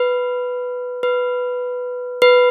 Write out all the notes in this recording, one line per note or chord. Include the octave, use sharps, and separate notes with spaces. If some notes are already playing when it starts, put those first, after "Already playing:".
Already playing: B4
B4
B4